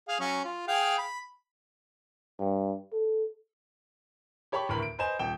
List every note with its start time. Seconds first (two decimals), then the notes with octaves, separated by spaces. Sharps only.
0.08 G#4 F5
0.20 F#3 C#4
0.45 F4
0.68 G#4 F5 G5
0.98 B5
2.39 G2
2.93 A4
4.52 G4 C#5 A5 B5 C#6
4.69 D2 A2 A#4 B4 B5
4.82 D7
4.99 B4 C5 D#5 G#5 E7
5.19 D#1 G5 E7